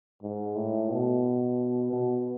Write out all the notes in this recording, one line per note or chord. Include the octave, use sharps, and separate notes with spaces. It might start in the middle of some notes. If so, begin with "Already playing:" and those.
G#2
A2
B2
B2